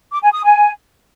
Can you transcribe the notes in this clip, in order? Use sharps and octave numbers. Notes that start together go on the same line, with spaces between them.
D6
G#5
D#6
G#5